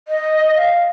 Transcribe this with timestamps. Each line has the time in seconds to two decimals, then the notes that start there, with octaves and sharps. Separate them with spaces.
0.08 D#5
0.56 F5